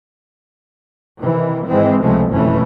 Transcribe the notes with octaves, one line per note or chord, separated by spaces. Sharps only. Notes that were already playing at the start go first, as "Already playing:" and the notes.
C3 D#3 E3
G#1 E3 G#3 C4
C#2 C3 F3 G#3 A3
F#1 F2 B2 E3 A3 C#4